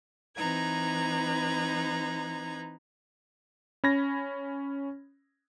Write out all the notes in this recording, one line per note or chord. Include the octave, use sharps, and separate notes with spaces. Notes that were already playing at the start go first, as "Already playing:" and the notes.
E3 C4 D#4 B4 A#5 G#6
C#4 B5 G#6 A#6